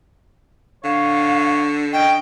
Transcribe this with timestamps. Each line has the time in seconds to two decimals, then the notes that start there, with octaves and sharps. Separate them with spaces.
0.84 D3 C#5 F5
1.93 C#4 D#5 G5